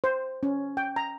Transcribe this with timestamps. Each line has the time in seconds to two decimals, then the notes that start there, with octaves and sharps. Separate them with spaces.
0.04 C5
0.43 C#4
0.77 G5
0.96 A#5